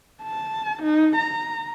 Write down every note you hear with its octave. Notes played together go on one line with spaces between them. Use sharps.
A5
D#4
A#5